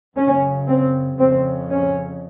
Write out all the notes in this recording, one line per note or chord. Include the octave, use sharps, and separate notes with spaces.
F#2 C#3 C#4
C4
F2 C#3 C4
C#4